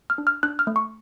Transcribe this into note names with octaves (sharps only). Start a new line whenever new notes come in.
F6
D4
F6
D4 F#6
F6
A3
C#6